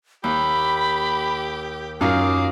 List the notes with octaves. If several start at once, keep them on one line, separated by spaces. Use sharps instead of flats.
D#2 G4 B5
F#2 D#4 F4 A#4 F5 D6